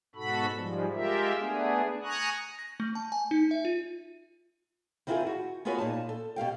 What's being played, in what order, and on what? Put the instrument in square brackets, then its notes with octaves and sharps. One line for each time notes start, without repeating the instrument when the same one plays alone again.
[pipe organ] G#2 B2 F#4 A4 B5
G#2 F3 G3 G#3
G#3 F4 G4 A#4 E5
A3 B3 D4 G#4
G#5 A#5 C#6 D#6 F#6
[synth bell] A#6
A3
A5
G#5
D#4
E5
F4
[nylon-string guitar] D#3 C4 E4 F4 G4 G#4
F#4
B3 F4 F#4 G#4 B4 C#5
A#2 D#4 A5
A4
B2 G4 F5 G5